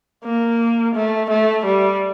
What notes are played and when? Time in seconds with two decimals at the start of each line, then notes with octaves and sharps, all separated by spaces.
0.24 A#3
0.95 A3
1.30 A3
1.65 G3